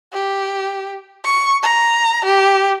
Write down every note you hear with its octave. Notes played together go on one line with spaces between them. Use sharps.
G4
C#6
A#5
G4